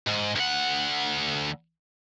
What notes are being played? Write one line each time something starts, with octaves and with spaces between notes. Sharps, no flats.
G#2
D2 F#5